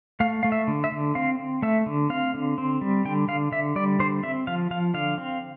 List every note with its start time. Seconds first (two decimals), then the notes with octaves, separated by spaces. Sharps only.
0.20 A3 F5
0.43 A3 F5
0.52 E5
0.67 D3
0.84 E5
0.92 D3
1.15 C4 F5
1.39 C4
1.62 A3 E5
1.86 D3
2.10 C4 F5
2.34 D3
2.58 C4
2.81 G3
3.05 D3 G5
3.28 D3 F5
3.52 D3 E5
3.76 G3 D5
4.00 D3 C5
4.23 C4 E5
4.47 F3 F5
4.71 F3 F5
4.94 D3 F5
5.18 C4